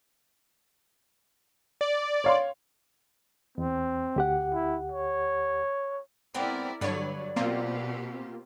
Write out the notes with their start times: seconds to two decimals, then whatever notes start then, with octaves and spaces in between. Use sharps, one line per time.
1.81 D5
2.24 C#5 F5 C6
3.58 E2 C4
4.16 D2 G4 F#5
4.54 E4
4.92 C#5
6.34 G#3 B3 C4 E4 A#4 D5
6.81 G2 D3 F#3 B4 C#5 D5
7.36 B2 A#3 C4 F4 G4